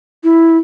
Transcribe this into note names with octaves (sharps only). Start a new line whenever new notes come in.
E4